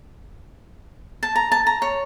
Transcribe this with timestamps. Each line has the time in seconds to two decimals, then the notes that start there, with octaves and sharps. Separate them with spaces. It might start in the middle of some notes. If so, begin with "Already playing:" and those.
1.23 A5
1.36 A#5
1.52 A5
1.67 A#5
1.82 C#5